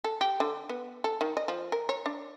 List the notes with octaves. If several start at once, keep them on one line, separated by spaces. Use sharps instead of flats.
A4
G4
D3
B3
A4
D#3
D#5
F3
A#4
C#5
D4